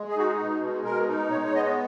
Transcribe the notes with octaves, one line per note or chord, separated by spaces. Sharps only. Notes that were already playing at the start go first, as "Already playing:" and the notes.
Already playing: G#3
G#4
D#4 F#4
G#4
B2
G#3
B2 A#4
D#4
G#3 C#5
C#5
B3 D#5